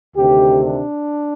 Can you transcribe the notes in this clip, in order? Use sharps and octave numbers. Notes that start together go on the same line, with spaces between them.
D2 C3 D#3 G4
D4